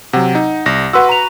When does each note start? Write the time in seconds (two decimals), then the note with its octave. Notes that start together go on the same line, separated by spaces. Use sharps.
0.13 C3 F#3 F#5
0.35 D#4
0.66 C2 A#6
0.93 F#4 B4 F#5 C6 E6
1.09 A#5 F7